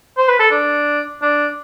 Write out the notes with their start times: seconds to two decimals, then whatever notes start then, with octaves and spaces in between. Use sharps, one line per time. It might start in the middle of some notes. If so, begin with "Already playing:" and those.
0.17 C5
0.28 B4
0.40 A4
0.51 D4
1.22 D4